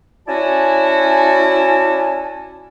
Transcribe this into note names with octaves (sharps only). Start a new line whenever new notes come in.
C#4 E4 F#4 D5 G#5 A5